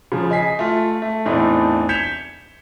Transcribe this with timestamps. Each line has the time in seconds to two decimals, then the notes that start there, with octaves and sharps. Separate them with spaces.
0.12 C#3 F3
0.30 D#5 G#5 B6 C7
0.59 A3 F4
1.02 A3
1.25 E2 A2 A3 C4 D4 D#4
1.89 G6 G#6 B6 C#7 E7 F7